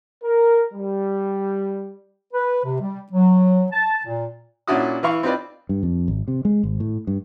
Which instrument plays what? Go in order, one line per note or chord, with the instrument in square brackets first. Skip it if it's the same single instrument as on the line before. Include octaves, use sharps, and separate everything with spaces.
[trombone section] A#4
G3
[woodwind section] B4
C3
G3
F#3
A5
A#2
[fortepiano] A#2 C#4 D4 E4 F#4 D#6
E3 E4 F5 C#6
C4 D#4 F4 B4 D5
[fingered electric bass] G2
F2
G#1
C3
G#3
G#1
A2
G2